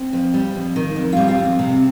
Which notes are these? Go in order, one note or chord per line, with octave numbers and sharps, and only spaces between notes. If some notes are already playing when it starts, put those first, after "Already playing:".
Already playing: C4
F2
G3
F2
D#3
F2
G3 C4 F4
C4 F4
F2
C4
C3 C4